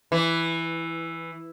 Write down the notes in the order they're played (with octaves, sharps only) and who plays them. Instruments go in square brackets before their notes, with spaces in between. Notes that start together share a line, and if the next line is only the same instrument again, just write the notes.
[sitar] E3